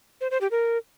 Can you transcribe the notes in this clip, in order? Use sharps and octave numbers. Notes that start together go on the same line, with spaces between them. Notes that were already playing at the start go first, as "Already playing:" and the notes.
C5
C5
G4
A#4